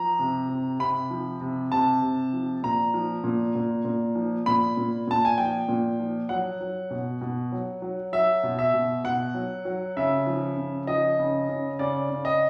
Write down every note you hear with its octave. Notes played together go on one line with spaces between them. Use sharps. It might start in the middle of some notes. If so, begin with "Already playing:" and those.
Already playing: F3 A#5
C3
C3
C3 B5
F3
C3
C3 A5
C3
F3
A#2 A#5
F3
A#2
A#2
A#2
F3
A#2 B5
A#2
A#2 A5
G#5
F3 G5
A#2
F3
F#3 F#5
F#3
B2
B2
F#3
F#3
F#3 E5
B2
E5
B2
B2 F#5
F#3
F#3
C#3 E5
F3
C#3
F3 D#5
C#3
C#3
C#3 D5
C#3
D#5